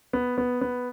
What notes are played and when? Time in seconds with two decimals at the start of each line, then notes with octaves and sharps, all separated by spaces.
0.13 B3
0.38 B3
0.61 B3